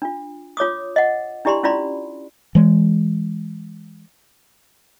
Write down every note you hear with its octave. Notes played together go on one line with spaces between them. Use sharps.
D4 F4
F4 C#5 D6 D#6
D#5 F#5
D4 E4 G4 D5 B5 C6
C#4 E4 F4 D5 B5 C6
E3 G#3